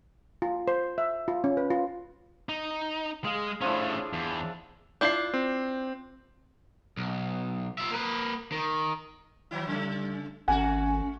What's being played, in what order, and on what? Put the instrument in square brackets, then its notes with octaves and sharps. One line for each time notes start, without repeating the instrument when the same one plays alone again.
[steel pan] F4
C5
E5
F4
C#4
B4
F4
[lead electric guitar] D#4
[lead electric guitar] G#3 [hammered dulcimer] G#4 F5
[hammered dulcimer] F3 D4 E4 [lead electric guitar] A3 C#4
[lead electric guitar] E2
[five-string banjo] D4 E4 F4 [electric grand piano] G6 C7
[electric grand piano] C4
[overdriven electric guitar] B1
F4 E5
A#3 B4
D#3
[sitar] D#3 F#3 E4
[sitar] C#3 A3 [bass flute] G3
[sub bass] G#1 [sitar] A3 F#4 [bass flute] C#4 [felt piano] F#5 G#5